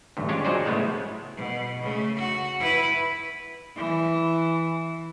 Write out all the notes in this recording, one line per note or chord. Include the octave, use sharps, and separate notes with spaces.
A1 D2 G2
G#3 C#4 D4 F4 G4 C#5
F3 F#3 D#4 G#4 C5 D5
A2 C#3 G#3 A3 B3 E4
B2
C#3 A3
F#4
E4 B4
E3